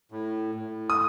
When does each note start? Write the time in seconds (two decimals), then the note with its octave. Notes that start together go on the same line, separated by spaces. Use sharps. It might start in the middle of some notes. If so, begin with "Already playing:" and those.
0.12 A2
0.55 A2
0.90 D#6